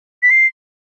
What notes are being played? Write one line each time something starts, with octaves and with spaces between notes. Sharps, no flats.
B6
C7